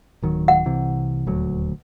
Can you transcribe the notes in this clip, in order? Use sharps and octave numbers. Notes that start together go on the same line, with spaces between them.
D1 D#3 F#3
F#5
C2 C3 E3
D#1 D2 F#3